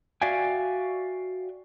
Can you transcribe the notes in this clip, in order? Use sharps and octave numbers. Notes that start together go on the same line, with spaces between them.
F#4 D5 E5 F5 G5 G#5